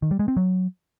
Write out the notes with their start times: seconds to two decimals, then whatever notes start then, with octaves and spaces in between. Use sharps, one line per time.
0.02 D#3
0.11 G3
0.19 G#3
0.28 C4
0.37 F#3